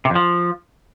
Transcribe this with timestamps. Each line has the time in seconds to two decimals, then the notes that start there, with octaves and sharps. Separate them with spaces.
0.05 C3
0.10 F2
0.15 F3